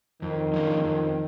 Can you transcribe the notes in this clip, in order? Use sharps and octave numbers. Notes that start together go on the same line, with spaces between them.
F2 D#3
D3 F3 A#3 C#4
F2